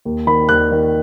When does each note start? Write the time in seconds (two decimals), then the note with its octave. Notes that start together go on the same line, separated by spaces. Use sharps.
0.05 D#2
0.27 D#3 B5
0.49 D#2 F#6
0.72 D#3